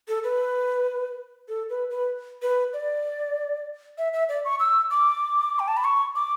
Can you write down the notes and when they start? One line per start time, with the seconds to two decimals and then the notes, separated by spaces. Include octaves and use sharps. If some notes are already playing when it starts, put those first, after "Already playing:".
0.08 A4
0.24 B4
1.48 A4
1.70 B4
1.90 B4
2.42 B4
2.73 D5
3.98 E5
4.13 E5
4.29 D5
4.45 C#6
4.60 E6
4.91 D6
5.59 G5
5.68 A5
5.77 B5
5.84 C#6
6.15 D6